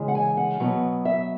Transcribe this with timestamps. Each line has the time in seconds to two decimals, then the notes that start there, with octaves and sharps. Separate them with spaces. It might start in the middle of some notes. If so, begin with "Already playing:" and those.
Already playing: C#3 E3 G#3
0.08 F#5
0.15 G#5
0.37 F#5
0.60 B2 F#3 B3
1.05 E5